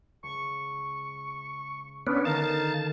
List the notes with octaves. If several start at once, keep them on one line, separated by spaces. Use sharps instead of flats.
C#2 C#6
B3 C#4 D4 B4
D3 D#3 A3 D#4 A#4 F5 A5